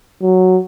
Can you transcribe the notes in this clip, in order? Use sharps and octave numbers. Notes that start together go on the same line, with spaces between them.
F#3